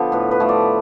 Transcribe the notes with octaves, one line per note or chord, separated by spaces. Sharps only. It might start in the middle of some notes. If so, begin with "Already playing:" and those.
Already playing: D3 F3 B3
A2 B4
B4
F3 A3
D5